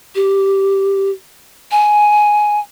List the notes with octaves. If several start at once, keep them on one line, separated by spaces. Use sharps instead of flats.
G4
G#5